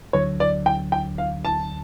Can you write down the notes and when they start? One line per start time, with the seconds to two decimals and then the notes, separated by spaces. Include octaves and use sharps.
0.13 D2 D3 F#3 C#5
0.40 D5
0.66 G5
0.92 G5
1.18 F5
1.45 A5